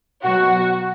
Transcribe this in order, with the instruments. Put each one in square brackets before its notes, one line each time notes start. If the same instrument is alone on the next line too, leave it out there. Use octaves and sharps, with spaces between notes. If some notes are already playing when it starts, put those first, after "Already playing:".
[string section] B2 F#3 F#4